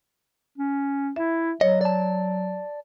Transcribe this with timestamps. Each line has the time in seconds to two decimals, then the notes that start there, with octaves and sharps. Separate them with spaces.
0.58 C#4
1.16 E4 E5
1.61 F#3 C#5 D#5
1.81 D5 A5